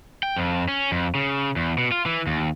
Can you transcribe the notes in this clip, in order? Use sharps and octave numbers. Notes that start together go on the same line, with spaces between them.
G5
F2
C#4
F2
C#3
E2
B2
F4
E3
D#2